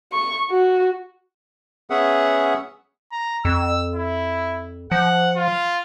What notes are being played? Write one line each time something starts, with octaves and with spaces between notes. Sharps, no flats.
C#6
F#4
B3 C#4 G#4 E5 F#5
A#5
F2 E6
E4
F3 F#5
F4